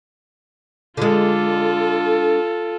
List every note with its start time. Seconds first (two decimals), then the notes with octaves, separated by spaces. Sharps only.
0.97 D3 G#3 F4 A4